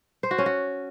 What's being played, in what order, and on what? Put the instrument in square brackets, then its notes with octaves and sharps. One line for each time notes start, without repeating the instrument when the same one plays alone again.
[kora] C5
F#4
C#4
F#4